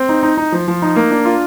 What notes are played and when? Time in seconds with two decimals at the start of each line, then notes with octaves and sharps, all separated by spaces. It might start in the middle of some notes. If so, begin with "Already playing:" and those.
Already playing: C4
0.09 D#4
0.23 D#4
0.38 D#4
0.52 F3
0.68 F3
0.82 D#4
0.96 A#3
1.11 D4
1.25 F4